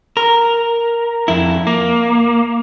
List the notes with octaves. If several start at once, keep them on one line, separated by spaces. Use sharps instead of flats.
A#4
F2 E4
A#3